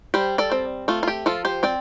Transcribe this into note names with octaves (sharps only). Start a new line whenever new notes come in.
G3 G4 C5
A4 D5
C4
A3 F4
F4
G4
F3 F4 A4
G4 C5
C4 D5 G5